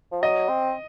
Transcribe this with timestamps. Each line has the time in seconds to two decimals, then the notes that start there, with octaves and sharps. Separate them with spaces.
0.12 F3
0.22 F#3 D#5
0.49 C4